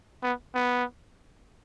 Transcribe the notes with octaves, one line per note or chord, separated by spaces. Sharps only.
B3
B3